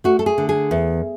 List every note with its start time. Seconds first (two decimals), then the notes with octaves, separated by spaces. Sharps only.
0.04 A3 F#4
0.19 A4
0.26 G#4
0.38 D3
0.49 G#4
0.71 E2